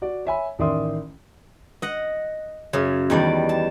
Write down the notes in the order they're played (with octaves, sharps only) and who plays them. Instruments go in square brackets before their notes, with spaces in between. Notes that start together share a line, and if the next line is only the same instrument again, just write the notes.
[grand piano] F#4 D5
C#5 E5 G#5 B5
A1 D#3 D5 E5 C6 D#6
[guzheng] D#5 F#5
F#2 C#3
E2 D#3 G3 D5
A5